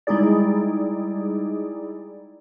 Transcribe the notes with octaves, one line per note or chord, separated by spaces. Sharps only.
G3 G#3 D#4 E4 G#4 D5